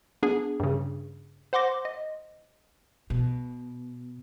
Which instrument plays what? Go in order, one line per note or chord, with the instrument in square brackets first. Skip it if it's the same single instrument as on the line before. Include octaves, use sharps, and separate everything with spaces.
[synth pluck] B3 D4 G#4
G2 C#3
C5 F#5 C6 D6 A#6
D#5
[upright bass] B2